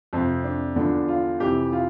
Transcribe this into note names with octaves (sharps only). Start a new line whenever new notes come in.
F2 C3 F3 C4
D4
E2 D3 F3 D4
F4
F2 C3 E3 G4
F4